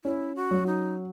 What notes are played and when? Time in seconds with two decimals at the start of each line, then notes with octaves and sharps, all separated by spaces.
0.04 C#4 E4
0.36 F#4
0.51 F#3
0.67 D#4